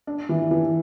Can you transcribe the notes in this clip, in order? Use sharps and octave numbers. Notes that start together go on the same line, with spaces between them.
D4
E3
E3